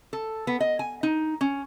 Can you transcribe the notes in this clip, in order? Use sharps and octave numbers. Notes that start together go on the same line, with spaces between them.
A4
B3
D#5
G#5
D#4
C#4